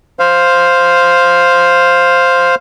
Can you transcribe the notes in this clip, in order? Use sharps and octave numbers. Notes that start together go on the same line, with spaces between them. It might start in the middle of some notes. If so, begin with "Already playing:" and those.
C5 F5